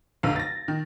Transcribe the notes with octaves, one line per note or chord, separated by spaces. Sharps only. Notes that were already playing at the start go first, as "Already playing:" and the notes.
F1 B1 D3 F5
A6 A#6
D#3